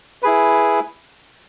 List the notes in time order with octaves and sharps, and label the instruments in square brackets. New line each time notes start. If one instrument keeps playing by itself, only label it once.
[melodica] E4 G#4 B4